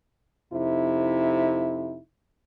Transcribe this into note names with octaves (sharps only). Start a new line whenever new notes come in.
F2 C3 D#4 E4